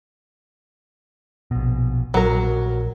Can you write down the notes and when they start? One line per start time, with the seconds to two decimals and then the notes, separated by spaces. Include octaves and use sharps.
1.51 A#1 B2
2.14 A#1 F#3 A#4